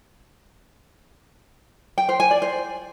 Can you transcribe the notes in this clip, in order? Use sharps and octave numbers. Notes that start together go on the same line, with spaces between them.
G5
C5
G#5
D5
C5